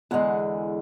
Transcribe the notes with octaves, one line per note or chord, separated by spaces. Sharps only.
E2 D3 G#3 F#5